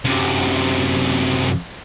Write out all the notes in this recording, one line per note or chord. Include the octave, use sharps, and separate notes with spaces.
F#2 C3